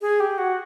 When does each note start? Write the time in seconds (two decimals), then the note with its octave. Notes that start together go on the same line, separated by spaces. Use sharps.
0.02 G#4
0.20 G4
0.38 F#4